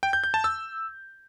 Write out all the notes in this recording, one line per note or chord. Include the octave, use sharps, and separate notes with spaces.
G5
G6
G6
A5
E6